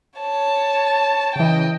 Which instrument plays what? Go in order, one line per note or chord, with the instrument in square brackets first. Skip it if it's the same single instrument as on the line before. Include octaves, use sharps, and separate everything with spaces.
[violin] C#5 A5
[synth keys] C#3 E3 [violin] D#5 G5